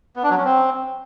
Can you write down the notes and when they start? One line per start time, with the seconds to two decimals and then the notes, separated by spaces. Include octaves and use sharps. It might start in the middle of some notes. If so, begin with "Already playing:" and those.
0.16 B3
0.23 D4
0.30 F#3
0.38 C#4
0.45 C4